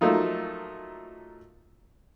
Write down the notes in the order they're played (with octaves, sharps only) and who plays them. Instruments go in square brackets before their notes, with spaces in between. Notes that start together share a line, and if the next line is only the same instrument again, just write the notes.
[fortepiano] F3 F#3 A3 A#3 D#4 F4